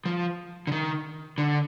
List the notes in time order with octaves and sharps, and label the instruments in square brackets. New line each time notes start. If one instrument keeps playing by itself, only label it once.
[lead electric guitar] F3
D3
D#3
D3